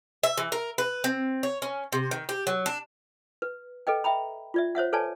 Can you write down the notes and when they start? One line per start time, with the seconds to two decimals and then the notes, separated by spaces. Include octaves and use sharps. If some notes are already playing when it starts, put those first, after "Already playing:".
0.23 E5
0.38 E3
0.52 A#4
0.78 B4
1.04 C4
1.43 C#5
1.62 C#4
1.92 C3
2.11 D#3
2.29 G4
2.47 F#3
2.66 D4
3.42 B4
3.87 A4 B4 D#5 G5
4.04 E5 G5 A#5 B5
4.54 F4 D5 E5
4.75 C5 C#5 E5 F#5
4.93 A4 B4 C#5 D5 G#5 A5